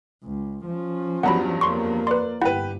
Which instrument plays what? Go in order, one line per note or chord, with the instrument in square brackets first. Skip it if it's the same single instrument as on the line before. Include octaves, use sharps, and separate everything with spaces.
[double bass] C#2
F3 C#4
[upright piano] E2 G2 F#3 [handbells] F#5 A#5 B5
[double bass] F2 A#3 [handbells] C6 C#6
[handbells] B4 C6 [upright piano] D5
[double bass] G1 [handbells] E4 F#5 [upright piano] G4 B4